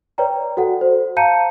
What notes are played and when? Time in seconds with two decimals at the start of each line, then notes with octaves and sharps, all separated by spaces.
0.18 B4 C#5 D5 G5 A#5
0.57 F#4 A4 F#5
0.81 C5
1.17 F5 A5 A#5 G6 C#7 D#7